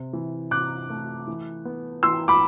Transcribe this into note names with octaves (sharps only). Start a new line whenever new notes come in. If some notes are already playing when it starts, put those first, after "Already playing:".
Already playing: C3
E3
C3 D6 F#6
A3
E3
B3
E3 C6 E6
B5 D6